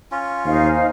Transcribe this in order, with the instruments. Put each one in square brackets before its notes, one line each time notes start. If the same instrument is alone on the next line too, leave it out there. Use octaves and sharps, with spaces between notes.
[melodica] C#4 F4
[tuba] D#2 [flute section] D#4 C5 F5